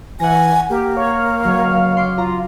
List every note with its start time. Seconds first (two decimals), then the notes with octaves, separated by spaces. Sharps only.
0.20 E3 F#5 G#5 A#6
0.70 A#3 G4
0.97 C#5 F5
1.44 C#2 F#3 C#5
1.97 C6 D6
2.18 F4 A#5